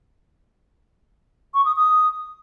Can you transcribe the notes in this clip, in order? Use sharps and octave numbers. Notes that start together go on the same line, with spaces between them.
C#6
D#6
D#6